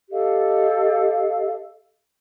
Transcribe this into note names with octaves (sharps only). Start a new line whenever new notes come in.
G4 A4 D#5 F5